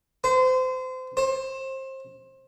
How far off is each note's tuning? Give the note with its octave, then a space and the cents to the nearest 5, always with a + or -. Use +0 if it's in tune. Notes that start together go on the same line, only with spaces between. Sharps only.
C5 -30
C5 +25